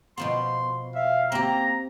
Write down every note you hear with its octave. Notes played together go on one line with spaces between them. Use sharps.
B2 F3 B3 C6
E5 F5
A#3 C4 G4 A#5